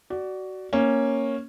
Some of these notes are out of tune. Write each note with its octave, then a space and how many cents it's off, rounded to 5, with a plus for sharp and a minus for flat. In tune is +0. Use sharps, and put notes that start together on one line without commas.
F#4 +20 D5 +0
A#3 +0 C#4 -10